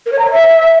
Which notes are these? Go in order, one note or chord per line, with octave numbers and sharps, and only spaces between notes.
A#4
C#5
A#5
C#5
E5